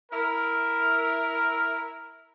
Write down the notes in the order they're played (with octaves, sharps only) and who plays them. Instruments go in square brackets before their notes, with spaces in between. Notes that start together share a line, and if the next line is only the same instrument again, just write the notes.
[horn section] E4 A#4